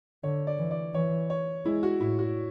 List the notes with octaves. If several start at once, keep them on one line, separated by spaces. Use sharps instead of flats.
D3 C#5
D5
E3
D5
E3 C#5
C#5
G#3 E4
F#4
A2 E4
F#4